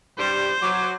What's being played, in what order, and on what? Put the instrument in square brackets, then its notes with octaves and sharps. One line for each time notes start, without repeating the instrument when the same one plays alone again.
[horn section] G2 G3 [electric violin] C5
[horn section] F#3 [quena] D6